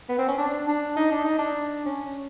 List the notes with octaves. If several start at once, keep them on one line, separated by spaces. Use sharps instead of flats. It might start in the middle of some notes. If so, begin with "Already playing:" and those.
B3
C4
C#4
D4
D4
D#4
D4
D#4
D4
C#4